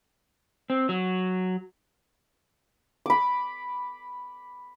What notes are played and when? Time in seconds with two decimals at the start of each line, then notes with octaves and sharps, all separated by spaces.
0.70 C4
0.89 F#3
3.06 B5 D6